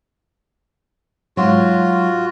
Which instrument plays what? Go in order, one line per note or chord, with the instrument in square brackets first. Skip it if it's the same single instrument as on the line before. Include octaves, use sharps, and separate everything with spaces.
[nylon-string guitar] G#2 F#3 [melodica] F4 F#4